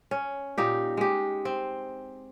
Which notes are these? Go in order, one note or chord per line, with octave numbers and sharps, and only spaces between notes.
C#4
A#2 D#4 G4
G#3 G4
C4